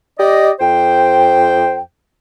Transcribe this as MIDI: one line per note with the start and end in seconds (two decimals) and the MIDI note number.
0.19 0.51 67
0.19 0.51 74
0.19 0.51 75
0.59 1.79 41
0.59 1.79 72
0.59 1.79 79